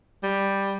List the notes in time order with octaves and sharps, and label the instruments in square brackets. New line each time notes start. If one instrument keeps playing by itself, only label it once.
[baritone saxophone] G3